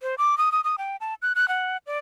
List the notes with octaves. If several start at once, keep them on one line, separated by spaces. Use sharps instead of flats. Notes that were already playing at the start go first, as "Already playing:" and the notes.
C5
D6
D#6
D#6
D#6
G5
A5
F#6
F#6
F#5
D5